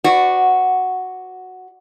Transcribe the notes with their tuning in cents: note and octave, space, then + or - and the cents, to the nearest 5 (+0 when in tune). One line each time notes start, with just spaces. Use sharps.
F#4 +0 B4 +30 D5 +0